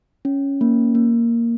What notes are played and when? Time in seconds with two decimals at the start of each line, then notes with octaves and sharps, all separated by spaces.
0.25 C#4
0.61 A#3
0.95 A#3